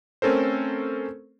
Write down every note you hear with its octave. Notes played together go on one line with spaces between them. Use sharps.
A3 C4 C#4 A4 A#4 C5